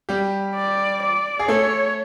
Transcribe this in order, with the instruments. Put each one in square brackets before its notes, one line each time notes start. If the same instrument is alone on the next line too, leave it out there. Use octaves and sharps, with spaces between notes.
[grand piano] G3 G4
[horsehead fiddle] D5
D5
[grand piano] G#4
[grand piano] A3 A4 [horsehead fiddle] C#5